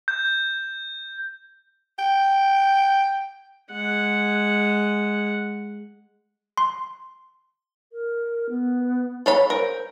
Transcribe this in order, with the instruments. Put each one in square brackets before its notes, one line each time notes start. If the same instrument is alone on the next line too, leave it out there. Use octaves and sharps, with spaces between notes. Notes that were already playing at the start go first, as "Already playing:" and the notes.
[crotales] G6
[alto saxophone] G5
[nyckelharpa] G#3 F#5
[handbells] C6
[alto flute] A#4
B3
[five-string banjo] A4 C#5 B5
[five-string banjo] A#4 [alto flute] C5